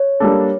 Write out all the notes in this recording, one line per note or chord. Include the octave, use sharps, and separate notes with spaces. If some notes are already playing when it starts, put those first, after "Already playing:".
Already playing: C#5
G3 A#3 D4 A4